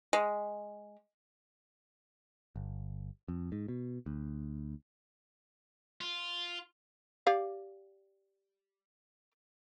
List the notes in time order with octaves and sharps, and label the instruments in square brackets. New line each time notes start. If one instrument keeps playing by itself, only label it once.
[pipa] G#3
[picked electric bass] G1
F2
G#2
B2
D2
[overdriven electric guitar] F4
[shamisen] G4 D5 F5